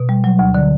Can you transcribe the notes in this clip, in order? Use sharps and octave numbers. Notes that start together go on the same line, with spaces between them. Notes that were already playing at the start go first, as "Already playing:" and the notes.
Already playing: B2
G3
F#3
D2
D3